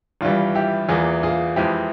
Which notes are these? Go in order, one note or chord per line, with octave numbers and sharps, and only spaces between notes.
G#1 G2 E3 G3 F4
E4 G4
E2 E3 A#3 F4 G#4
F4 G#4
F2 E3 G#3 C4 E4 G4